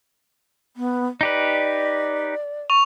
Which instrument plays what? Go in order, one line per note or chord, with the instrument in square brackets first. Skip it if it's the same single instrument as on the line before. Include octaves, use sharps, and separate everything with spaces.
[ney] B3
[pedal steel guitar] D#4 G4 B4 [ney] D5
[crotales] C#6 F7